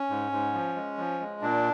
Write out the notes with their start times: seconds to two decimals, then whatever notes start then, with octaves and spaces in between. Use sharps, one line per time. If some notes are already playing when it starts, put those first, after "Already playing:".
Already playing: C#4
0.10 G#2
0.32 G#2
0.53 F3
0.76 G#3
0.98 F3
1.20 G#3
1.42 A#2 D4